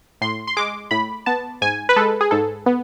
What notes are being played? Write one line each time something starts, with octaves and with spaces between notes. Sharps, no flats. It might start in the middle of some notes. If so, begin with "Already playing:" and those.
A2 C6
C6
G#3 D6
A2 B5
B3 A5
G#2 G#5
B4
G#3 A4
G#4
G#2 A4
B3